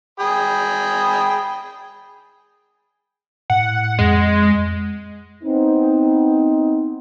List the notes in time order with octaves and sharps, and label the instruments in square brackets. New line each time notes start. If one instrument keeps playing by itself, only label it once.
[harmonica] G#4 G5 B5
[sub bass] A2 [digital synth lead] F#5
[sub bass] F2 [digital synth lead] G#3
[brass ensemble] B3 C4 D#4